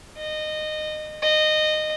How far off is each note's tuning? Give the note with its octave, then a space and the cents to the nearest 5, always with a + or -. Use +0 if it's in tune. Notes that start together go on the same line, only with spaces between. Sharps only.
D#5 -20
D#5 -20